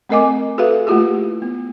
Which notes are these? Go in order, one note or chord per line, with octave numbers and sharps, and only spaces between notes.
A3 C4 A#4 D#5 G#5 D6
F#4 G#4 A4 B4 E5 F5
A3 A#3 E4 F4 G4 G#4
B3